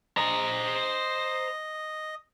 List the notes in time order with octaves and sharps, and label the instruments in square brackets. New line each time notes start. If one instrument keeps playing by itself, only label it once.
[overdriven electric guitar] C5 A#5 [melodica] D#5